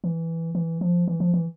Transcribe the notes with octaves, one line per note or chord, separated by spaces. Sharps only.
E3
E3
F3
E3
F3
E3